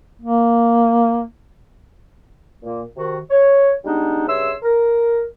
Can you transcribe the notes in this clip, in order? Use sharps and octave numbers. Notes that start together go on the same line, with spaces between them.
A#3
A#2 A#3
C3 D#3 F#4
C#5
G3 G#3 B3 D4 D#4
G2 C#3 C#5 E5 C6 E6
A#4